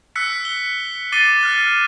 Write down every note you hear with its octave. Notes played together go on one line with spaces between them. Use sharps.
E6 F#6 B6 C#7
G7
D6 A6 C7 D#7 G7
F6 F#6 A6